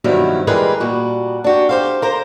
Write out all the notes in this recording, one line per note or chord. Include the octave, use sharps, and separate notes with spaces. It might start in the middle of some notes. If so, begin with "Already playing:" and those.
G2 B2 D#3 F3 F#3 E4
E3 G3 G#3 G#4 A#4 B4
A#2 G3 F#4
D4 F#4 G4
G4 C5 F5
A#4 C5 A#5